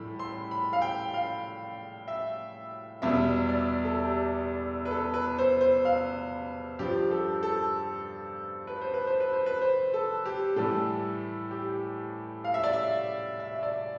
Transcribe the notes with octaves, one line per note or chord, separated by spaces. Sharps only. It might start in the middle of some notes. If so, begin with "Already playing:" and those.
Already playing: A2 E3 G3 B5
C6
B5
F5
G5
F5
E5
E2 B2 G3 E5
D5
A4
G4
B4
A4
B4
C5
C5
F5
G2 F3 G4
A4
A4
B4
C5
B4
C5
B4
C5
B4
C5
A4
G4
A2 E3 G3 A4
G4
F5
E5
D5
E5
E5
E5
D5